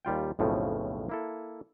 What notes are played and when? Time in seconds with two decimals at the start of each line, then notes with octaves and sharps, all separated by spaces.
0.05 D#2 G3 F4 G5
0.39 B1 F2 A2 C#3 F3
1.09 A#3 E4 A4